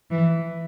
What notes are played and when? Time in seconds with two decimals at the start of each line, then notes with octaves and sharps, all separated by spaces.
0.11 E3